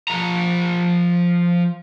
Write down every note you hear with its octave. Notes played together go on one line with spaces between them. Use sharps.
F3 A#5